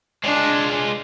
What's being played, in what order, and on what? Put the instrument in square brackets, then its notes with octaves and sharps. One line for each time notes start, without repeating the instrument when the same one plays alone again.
[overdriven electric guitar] G#3 F4 [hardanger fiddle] D4